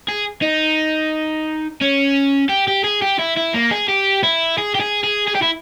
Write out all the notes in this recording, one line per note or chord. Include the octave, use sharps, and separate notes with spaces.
G#4
D#4
C#4
G4
G4
G#4
G4
E4
E4
A#3
G#4
G4
E4
G#4
G4
G#4
G#4
G#4
G4
E4